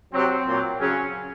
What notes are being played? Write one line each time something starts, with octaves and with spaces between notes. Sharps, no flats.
C3 F#3 C4
A#2 F#3
C#3 F#3 C#4